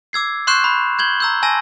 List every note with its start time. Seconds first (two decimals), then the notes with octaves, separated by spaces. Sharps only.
0.13 D6 E6 G#6 C7
0.47 C6 C#6 F#6 G6 C7 E7
0.64 B5
0.99 G6 G#6 F#7 G7
1.20 A#5 E6 G6
1.43 G#5 A5 E6 A#6